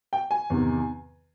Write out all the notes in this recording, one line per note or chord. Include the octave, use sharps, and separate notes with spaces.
G5
G#5
E2 C3 D#3